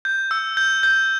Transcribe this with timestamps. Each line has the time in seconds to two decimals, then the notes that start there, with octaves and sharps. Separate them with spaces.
0.05 G6
0.31 E6
0.57 G6
0.83 G6